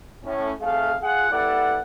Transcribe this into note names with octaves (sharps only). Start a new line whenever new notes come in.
A2 C#4
B1 C3 A3 G#4 F5
F4 G#4 F#5
G3 B3 E4 A4 D5 F#5